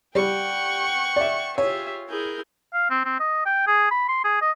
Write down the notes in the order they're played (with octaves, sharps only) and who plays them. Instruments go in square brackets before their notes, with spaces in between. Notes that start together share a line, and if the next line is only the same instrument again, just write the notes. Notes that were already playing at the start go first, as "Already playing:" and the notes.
[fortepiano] G3 [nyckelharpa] F#5 G5 [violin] C#6
[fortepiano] D5 E5
[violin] F4 G#4 [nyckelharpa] G4 E5 [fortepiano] C#5
[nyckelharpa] E4 G#4 [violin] A#4 G6
[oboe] F5
C4
C4
D#5
G5
G#4
B5
C6
G#4
D#5